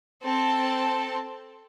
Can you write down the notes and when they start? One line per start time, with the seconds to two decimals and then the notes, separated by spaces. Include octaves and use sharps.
0.24 C4 A4 A5